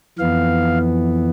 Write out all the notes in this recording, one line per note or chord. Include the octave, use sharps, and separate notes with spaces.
F2 E3 B3 F5